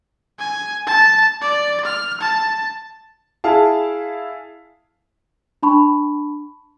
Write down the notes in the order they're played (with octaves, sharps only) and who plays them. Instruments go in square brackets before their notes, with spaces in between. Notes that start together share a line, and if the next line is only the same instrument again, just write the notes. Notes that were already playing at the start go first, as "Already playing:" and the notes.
[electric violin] G#5
A5
D5
F6
A5
[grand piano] E4 G#4 F5 A5
[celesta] D4 A5 B5 C#6